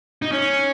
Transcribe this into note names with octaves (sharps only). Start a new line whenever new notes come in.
D#4
C#4